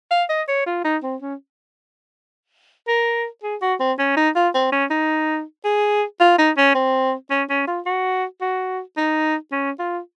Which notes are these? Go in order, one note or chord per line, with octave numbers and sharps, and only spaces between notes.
F5
D#5
C#5
F4
D#4
C4
C#4
A#4
G#4
F#4
C4
C#4
D#4
F4
C4
C#4
D#4
G#4
F4
D#4
C#4
C4
C#4
C#4
F4
F#4
F#4
D#4
C#4
F4